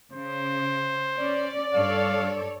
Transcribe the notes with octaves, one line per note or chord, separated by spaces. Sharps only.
C#3 C5
C#4 D5
G2 A4 C#5 F5